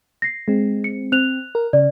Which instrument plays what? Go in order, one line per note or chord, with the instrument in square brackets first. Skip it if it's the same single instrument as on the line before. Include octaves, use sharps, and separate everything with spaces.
[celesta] A#6 C7
[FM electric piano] G#3 C4
[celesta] C#7
[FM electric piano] C4 [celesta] F#6 F7
[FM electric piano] A#4
[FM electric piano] C#3 [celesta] D5